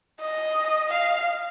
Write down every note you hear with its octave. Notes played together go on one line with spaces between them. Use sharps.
D#5
F5